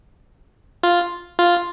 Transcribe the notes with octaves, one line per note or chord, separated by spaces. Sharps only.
F4
F4